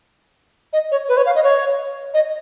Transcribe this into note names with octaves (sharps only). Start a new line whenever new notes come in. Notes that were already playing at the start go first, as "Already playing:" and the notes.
D#5
C#5
B4
C#5
F5
D#5
C#5
D#5